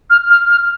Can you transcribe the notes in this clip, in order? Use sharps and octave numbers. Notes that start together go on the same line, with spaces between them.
F6
F6
F6